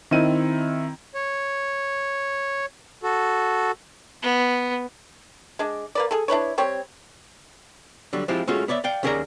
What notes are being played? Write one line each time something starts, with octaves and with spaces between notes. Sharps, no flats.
D#3 C4 E4 D#7
C#5
F#4 A4
B3
G#3 D4
A#3 B4 D5
G#4 A4
D4 E4 B4 C#5
G3 C4 C#5
D3 F#3 G3
F3 G#3 C4 E4 F4 G4
G#3 A3 C#4 F4 F#4
B3 C#5 D5 E5
D5 F5 G5
D#2 C#4 G#4 A#4 D5 A#5